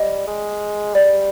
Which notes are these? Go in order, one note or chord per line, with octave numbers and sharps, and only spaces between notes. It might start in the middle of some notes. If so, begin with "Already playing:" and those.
Already playing: G3 D#5
G#3
G3 D5